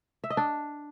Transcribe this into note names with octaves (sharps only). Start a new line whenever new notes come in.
E5
D#5
D4